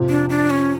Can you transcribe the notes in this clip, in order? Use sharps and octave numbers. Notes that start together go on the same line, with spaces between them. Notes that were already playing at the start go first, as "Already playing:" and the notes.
Already playing: F2 C3 F3
D4
D4
C#4